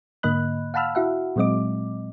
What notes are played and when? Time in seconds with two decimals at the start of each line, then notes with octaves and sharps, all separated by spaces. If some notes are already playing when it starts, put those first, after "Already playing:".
0.23 G#2 D3 A#3 D#5 B5 F#6
0.74 F5 F#5 A5 B5 E6 F6
0.95 E4 F#4 E5 F#5
1.36 A#2 F#3 G#3 C4 D#5 D6